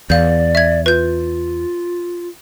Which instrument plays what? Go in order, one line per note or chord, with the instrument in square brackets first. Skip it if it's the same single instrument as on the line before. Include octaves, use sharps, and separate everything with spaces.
[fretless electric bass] E2 [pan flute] D5 [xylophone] F5 G6
[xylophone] E5 G#6
[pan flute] F4 [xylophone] B4 G6